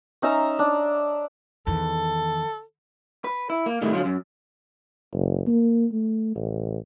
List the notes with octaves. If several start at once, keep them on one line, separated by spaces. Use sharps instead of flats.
C#4 D#4 E5 A#5
D4
E2 D#3 A4
B4
E4
A#3
A2 C3 D#3 G3 A3 E4
D3 F#3 F4
F#2
F#1
A#3
A3
A1